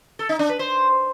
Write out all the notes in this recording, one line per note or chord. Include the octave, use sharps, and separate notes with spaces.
A4
D#4
D4
B4
C5